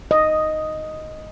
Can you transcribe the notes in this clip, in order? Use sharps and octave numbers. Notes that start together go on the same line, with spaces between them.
D#5